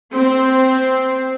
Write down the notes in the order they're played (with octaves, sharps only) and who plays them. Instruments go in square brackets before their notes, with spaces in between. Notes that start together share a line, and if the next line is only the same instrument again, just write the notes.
[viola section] C4